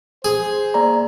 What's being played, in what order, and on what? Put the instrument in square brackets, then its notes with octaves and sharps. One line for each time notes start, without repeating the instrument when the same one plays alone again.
[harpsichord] G#4 [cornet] C5
[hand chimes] A#3 D5 A#5